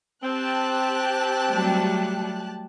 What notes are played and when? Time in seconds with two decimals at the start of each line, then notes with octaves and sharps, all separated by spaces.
0.23 C4 G4 A5 F#6
1.48 F#3 G3 A3